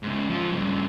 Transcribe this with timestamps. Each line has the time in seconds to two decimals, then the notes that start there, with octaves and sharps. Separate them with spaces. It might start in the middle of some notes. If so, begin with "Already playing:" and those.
0.03 G#2 C#3
0.29 F2 F3
0.51 G2 C#3